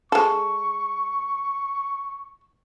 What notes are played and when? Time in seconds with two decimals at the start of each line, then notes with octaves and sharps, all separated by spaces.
0.12 G#3 A4 C#6